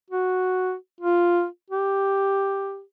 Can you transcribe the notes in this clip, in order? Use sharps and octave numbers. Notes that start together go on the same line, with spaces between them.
F#4
F4
G4